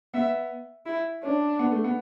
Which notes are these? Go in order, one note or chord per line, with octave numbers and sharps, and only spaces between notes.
B3 E5
E4
C#4 D4
B3
A3
B3